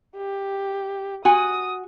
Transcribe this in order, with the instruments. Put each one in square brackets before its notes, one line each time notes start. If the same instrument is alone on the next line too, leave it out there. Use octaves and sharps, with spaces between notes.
[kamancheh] G4
[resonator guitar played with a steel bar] F#4 G#5 [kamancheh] D#6